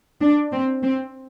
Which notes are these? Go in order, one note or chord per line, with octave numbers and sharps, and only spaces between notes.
D4
C4
C4